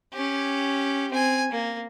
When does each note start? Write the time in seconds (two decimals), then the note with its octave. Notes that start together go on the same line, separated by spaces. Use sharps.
0.14 C#4 G4
1.12 C4 G#5
1.52 A#3